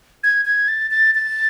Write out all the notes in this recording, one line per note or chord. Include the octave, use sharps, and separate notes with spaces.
G#6
G#6
A6
A6
A6